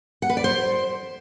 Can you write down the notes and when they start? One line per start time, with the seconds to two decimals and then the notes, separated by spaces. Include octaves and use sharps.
0.22 F#5
0.30 B4
0.37 D5
0.44 C5